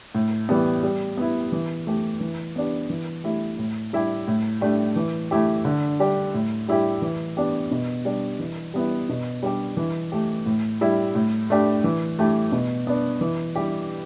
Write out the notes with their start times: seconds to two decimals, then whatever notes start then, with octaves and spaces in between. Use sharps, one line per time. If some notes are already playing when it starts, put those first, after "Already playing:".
0.15 A2
0.49 E3 G3 B3
0.83 G3
1.17 B3 E4
1.52 E3
1.87 A3 G4
2.20 E3
2.56 B3 D4 G4
2.90 E3
3.24 A3 E4 G4
3.59 A2
3.93 G3 E4 G4
4.28 A2
4.61 A3 D4 G4
4.96 E3
5.31 A3 E4 G4
5.65 D3
6.00 G3 D4 G4
6.34 A2
6.69 G3 E4 G4
7.02 E3
7.37 B3 D4 G4
7.71 B2
8.05 G3 D4 G4
8.40 E3
8.74 G3 B3 E4
9.09 B2
9.43 G3 D4 G4
9.77 E3
10.12 A3 G4
10.46 A2
10.81 G3 E4
11.15 A2
11.50 A3 D4 G4
11.84 E3
12.19 A3 E4 G4
12.52 B2
12.87 B3 D4
13.21 E3
13.56 G3 E4 G4